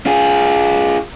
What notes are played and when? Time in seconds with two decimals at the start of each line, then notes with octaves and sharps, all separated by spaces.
0.06 F4 G#4